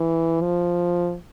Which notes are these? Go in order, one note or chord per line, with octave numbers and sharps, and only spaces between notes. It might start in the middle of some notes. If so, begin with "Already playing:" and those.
Already playing: E3
F3